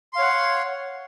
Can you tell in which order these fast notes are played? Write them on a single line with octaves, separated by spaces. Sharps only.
C6 F5 C#5 F#5